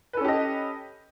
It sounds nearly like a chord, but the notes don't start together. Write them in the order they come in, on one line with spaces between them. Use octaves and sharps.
B4 A4 C#4 G4 D#5